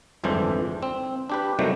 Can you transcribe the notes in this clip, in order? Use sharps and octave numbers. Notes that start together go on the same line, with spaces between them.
G1 F2 G#2 E3 D4 C5
C4
D4 G4 B4
C3 D#3 F#3 G3 A3